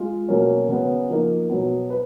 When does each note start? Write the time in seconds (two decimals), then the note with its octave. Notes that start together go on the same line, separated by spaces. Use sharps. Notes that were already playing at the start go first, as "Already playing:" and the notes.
Already playing: G#3 F4
0.28 B2 F#3 A#3 C#4
0.69 C#3 F#3 B3
1.09 F3 A#3 D#4
1.50 B2 F#3 B3
1.90 B4